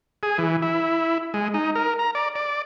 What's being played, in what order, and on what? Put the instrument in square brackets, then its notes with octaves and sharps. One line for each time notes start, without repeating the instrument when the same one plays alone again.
[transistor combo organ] G#4
E3
E4
G#3
D#4
A#4
A#5
D5
D5